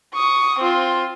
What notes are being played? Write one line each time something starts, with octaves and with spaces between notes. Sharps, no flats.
C#6 D#6
C4 F4